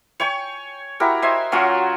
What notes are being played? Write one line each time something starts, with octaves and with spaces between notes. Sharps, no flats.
C#5 G5 G#5 C#6
E4 F#4 G4 A#4
C5 D#5 E5 G#5
F#3 C#4 F4 F#4